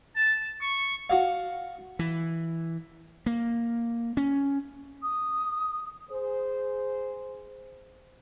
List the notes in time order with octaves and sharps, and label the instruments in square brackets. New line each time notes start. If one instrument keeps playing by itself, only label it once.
[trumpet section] A5
C#6
[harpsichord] F#4 F5
[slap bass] E3
A#3
C#4
[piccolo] D#6
[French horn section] G#4 C5